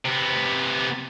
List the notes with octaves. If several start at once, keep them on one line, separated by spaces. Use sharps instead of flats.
C3 B3